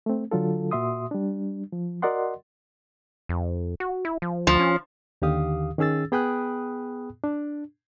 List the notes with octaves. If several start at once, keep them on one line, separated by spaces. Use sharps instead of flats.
A3 C4
D3 F#3 F4 A4
A#2 F#4 E5 C6 D#6
G3 D4
F3
F#4 A#4 D5 D#5 F#5 C6
F2
F#4
E4
F3
D2 F3
C#4
D#2 D3 D#3 G4 F5 D#6
D#3 C#4 G#4 E6 A6
B3 G#4 G5 B5 D#6 F#6
D4